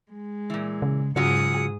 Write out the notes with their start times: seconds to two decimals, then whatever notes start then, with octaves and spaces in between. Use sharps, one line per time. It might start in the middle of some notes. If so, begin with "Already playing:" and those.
0.13 G#3
0.50 A#2 E3
0.82 C#3
1.16 G#2 C#3 F#3 F4 F#4 G#4 D#6 C#7